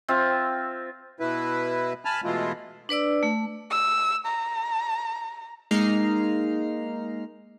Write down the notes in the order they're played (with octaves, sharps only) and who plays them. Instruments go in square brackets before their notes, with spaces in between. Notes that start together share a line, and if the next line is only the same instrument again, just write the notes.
[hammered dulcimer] C4 F4 E5
[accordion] B2 E4 B4
G#5 A5 B5 F6
B2 E3 G#3 A3 E4 F4
[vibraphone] D4 B4 D5 E6
A3
[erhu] E6
A#5
[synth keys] G#3 A#3 D#4 A#5 F6 C7